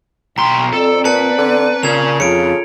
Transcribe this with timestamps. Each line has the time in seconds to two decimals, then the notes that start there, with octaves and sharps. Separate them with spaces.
0.38 B1 G5 A#5 C6
0.73 F2 C4 A4 D5
1.05 A#2 B4 A5 C#7
1.38 D3
1.83 A#2 C#3 G#6 F7
2.20 F2 C#3 F4 A4 C#7 D7